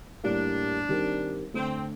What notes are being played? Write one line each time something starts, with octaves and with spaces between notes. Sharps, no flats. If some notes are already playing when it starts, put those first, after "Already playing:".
A2 G3 A#3 D4
D#3 G3 C4 G4 A#4
D3 A3 C4 D4